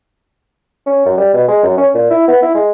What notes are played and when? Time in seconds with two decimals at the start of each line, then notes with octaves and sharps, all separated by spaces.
0.87 C#4
1.06 F#2
1.17 G3
1.34 B2
1.49 G#3
1.63 F#2
1.78 C#4
1.95 A#2
2.11 E4
2.28 B3
2.42 E4
2.55 G#3